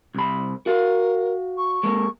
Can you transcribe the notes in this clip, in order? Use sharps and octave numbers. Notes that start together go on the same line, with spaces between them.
C2 B5
F#4 A#4 F5
C#6
G#3 A#3